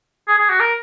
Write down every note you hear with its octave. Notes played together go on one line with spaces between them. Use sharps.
G#4
G#4
F#4
A#4